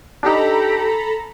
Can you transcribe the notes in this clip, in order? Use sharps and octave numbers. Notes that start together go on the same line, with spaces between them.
D4 D#4 G4 A4 A#5 B5